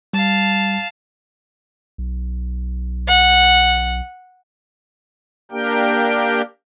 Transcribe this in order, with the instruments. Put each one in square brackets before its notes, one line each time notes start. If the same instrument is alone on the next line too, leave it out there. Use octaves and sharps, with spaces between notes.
[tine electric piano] G3 [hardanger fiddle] F5 A5
[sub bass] B1
[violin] F#5
[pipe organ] A#3 D4 G4 A#4 G5